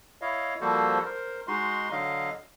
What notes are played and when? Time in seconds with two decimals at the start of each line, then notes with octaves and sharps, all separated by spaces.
0.22 E4 C#5 D#5 F5
0.61 F3 G3 A#3 F#4 A4 C5
1.05 A#4 C5
1.48 G#3 D#4 F#4 C6
1.92 D3 F#3 D#5 F5